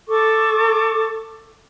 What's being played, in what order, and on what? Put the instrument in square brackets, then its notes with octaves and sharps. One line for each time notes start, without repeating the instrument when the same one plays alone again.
[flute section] A4 C#6 D6